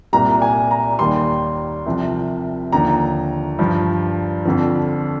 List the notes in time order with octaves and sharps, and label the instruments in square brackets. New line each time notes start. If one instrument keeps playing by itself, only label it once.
[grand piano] C2 A#2 G3 A#5
G#5
A#5
D#2 D#3 G3 C6
C2 C3 F3
D#2 D3 F3 A#5
G2 F3
F2 D3 F3